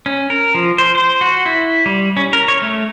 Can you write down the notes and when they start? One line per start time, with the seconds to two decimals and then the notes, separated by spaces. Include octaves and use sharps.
0.06 C#4
0.30 A#4
0.55 F3
0.78 C5
0.95 C5
1.21 F#4
1.46 E4
1.86 G3
2.17 C#4
2.33 A#4
2.48 C#5
2.62 A3